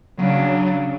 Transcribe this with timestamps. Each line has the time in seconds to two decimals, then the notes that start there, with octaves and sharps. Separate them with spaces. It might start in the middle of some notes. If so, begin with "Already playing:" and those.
0.19 C#3 F#3 D4